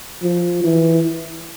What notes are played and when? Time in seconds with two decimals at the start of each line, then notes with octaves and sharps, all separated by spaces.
0.23 F3
0.64 E3